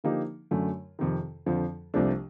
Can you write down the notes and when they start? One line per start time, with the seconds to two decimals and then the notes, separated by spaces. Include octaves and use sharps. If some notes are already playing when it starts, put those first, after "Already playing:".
0.04 D3 F3 A#3 D#4 G4
0.51 F#2 D3 F#3 A3
0.99 F2 C3 D#3
1.46 F2 D3 F3
1.94 C2 C3 F3 A3 D4